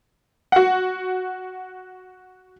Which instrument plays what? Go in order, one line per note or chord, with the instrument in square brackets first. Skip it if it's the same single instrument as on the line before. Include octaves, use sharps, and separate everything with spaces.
[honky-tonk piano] F#4 F#5